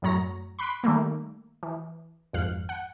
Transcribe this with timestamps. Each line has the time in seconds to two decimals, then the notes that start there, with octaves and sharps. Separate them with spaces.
0.02 F#2 A2 F#3 C#5 A#5 A#6
0.59 B5 C6 F#6 B6 C7 D7
0.83 D#3 G3 A3 A#3
1.63 E3
2.33 G#1 F2 F5 F#6
2.69 F#5